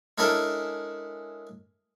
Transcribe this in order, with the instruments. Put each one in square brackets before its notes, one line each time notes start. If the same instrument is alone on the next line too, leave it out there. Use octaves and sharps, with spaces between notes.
[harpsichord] G#3 C#4 D4 E4 A4 A#4